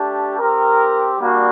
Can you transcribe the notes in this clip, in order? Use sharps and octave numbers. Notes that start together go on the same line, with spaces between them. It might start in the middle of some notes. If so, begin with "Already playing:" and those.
Already playing: A3 D4 G4
C4 G4 A#4
G3 A#3 D4 F#4